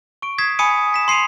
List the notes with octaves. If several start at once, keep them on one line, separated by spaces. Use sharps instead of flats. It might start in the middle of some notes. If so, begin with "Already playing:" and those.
C#6 D7
D#6 G#6 B6 C7 E7
G#5 B5 D#6 C#7 D#7
B6 E7
C6 C7 C#7 D#7 F7